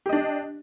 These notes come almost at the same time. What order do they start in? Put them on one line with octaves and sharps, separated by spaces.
G4 D#5 D4